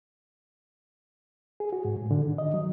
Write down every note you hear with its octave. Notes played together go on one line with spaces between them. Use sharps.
G#4
F#4
G#2
A2
D3
D#3
D#5
F#3